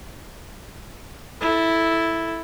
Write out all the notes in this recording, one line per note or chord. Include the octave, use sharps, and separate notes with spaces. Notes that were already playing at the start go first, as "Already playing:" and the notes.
E4 A4